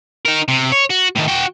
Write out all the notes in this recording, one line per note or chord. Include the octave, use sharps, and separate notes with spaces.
D#4 A#4
C3
C#5
F#4
A2 D#3
F#4 G5